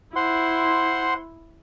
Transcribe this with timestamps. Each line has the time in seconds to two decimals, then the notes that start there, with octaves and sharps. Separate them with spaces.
0.16 E4 C5 F#5 C6